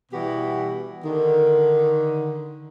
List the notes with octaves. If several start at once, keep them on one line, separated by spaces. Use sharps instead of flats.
B2 E3 G3 B3 F#4 G4
D3 D#3